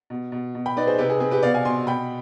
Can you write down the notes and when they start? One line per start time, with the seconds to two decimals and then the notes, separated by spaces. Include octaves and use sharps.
0.10 B2
0.32 B2
0.55 B2
0.66 G5 B5
0.77 D#4 B4 D5
0.87 G#4 C5
0.98 C3 G4 B4
1.10 G#4
1.20 C4 G#4
1.31 G4 B4
1.43 B2 D5 F5
1.54 F5 G#5
1.65 B2 G#5 C6
1.87 B2 G5 B5